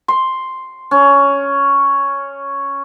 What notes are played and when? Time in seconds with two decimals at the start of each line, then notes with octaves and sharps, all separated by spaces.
0.08 C6
0.91 C#4